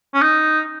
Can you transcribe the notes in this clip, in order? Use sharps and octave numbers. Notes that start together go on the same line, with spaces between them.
C#4
D#4